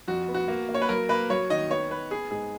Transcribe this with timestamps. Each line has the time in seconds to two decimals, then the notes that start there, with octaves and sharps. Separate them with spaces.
0.08 F2 F#4
0.28 B3
0.34 F#4
0.48 A#3
0.69 A#3
0.74 C#5
0.82 B4
0.89 F#3 A#4
1.09 A#3 B4
1.29 F#3 C#5
1.50 D#3 D#5
1.70 B3 C#5
1.90 B3 B4
2.11 B3 G#4
2.31 G#2 G#4